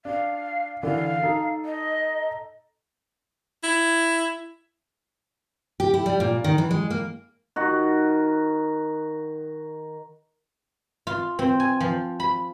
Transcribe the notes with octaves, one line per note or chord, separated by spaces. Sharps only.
D4 F5
D3 E3 F5
D#4 A4
D#5
E4
G4
E4
G3
A#2
D#3
E3
G#3
A#3
D#3 F#4
F4
C4
G#5
F3
B5